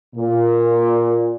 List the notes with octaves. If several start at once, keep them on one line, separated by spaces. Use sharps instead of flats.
A#2